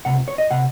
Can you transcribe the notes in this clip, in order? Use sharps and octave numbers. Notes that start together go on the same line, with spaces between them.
C#2 C3 F#5
C#5
D#5
C3 F#5